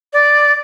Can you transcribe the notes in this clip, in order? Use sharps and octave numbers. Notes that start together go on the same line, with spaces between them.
D5